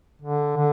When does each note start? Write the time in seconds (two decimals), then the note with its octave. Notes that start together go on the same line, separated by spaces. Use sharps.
0.22 D3
0.57 D3